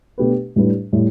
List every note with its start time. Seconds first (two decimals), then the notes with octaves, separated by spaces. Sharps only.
0.18 B2 A3 D4 G4 B4
0.56 A2 G3 D4 B4
0.93 A2 G3